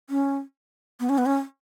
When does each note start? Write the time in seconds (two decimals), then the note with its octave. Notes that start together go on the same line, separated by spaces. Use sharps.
0.10 C#4
1.00 B3
1.09 C#4
1.18 B3
1.26 C#4